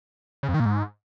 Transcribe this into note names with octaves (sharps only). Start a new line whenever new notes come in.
C#3
F2
D#3
A#2
G#2